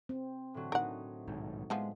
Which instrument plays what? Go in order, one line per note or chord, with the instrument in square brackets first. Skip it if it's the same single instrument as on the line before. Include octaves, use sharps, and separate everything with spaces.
[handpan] C4
[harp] A2 D3 F#3
[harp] A2 D#4 [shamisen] A#4 F#5
[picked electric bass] B1 G#2 D#3
[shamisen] E3 F3 B3 [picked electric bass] G#3